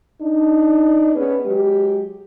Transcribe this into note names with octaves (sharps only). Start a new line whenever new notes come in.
D4 D#4
B3 C#4 G#4 B4
F#3 G#3 G4